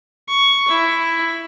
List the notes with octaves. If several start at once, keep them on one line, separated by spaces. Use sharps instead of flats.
C#6
E4